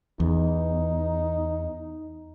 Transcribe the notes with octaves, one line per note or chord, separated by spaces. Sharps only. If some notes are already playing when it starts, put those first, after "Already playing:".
E2 D#4